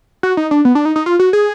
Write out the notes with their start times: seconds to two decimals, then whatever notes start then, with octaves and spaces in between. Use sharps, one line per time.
0.23 F#4
0.37 D#4
0.51 D4
0.65 B3
0.75 D4
0.85 D#4
0.96 D#4
1.06 F4
1.19 F#4
1.33 G#4